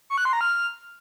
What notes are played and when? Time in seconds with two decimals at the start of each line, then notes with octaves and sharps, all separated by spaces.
0.10 C#6
0.18 F#6
0.25 C6
0.33 A#5
0.41 F6